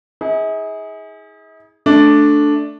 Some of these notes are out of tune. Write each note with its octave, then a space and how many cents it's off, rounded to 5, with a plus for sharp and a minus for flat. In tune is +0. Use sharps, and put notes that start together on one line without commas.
E4 -45 G#4 +0
A3 +0 D4 +0